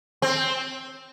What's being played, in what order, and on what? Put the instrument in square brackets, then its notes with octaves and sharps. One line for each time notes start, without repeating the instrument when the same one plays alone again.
[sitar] C4